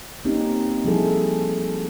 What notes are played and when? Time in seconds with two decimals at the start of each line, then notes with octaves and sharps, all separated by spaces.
0.25 A#3 C4 C#4 D#4 G4
0.85 F3 G3 D#4 E4 G#4 A4